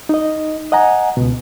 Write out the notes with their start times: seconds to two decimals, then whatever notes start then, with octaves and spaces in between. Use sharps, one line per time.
0.09 D#4 D#5
0.72 D#5 F#5 G#5 A#5
1.17 C#2 B2